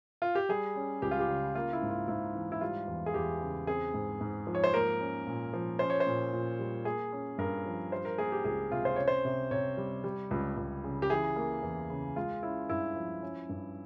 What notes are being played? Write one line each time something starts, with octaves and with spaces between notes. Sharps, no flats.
F4
G4
G3 G#4
C#4
C#2 G4
F4
G4
C#3
A#3 F4
E4
G#2
F4
G#2 E4
E3
E4
G3 F4
E2
G#4
E2 G4
C#3
C4 G#4
G#2
G#2
F3
C#5
C5
A#3 A#4
C#4
A#2
F3
C#4 C5
C#5
C5
A#2
A#2
G3
A#3 G#4
C#4
G2 A#4
F3
G3 C5
A#4
A#3 G#4
G4
C#2 G#4
C3 F4
C5
C#4 C#5
C5
C3
C3 C#5
G3
G3
C#2
C#2
C#3
G4
E3 G#4
A#3
E2
C#3
G#3 F4
C#4 E4
G2 E4
F3
C#4
G2